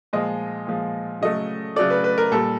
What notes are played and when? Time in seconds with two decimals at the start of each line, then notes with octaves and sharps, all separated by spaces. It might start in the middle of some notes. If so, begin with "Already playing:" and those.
0.13 A#2 F3 G#3 D#5
0.67 A#2 F3 G#3
1.21 C#3 F#3 A3 D#5
1.76 C#3 F#3 A3 D5
1.90 B4
2.04 B4
2.18 A#4
2.31 A#2 G3 A4